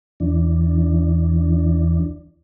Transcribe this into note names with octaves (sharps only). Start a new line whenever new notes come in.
E2 E3 D4